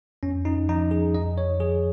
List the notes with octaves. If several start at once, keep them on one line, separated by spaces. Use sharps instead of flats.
F2 C#4
D#4
F3 D#4
G#4
F2 D#5
C#5
F3 G#4